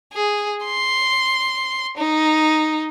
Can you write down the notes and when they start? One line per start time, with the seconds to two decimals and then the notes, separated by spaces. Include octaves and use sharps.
0.13 G#4
0.65 C6
1.97 D#4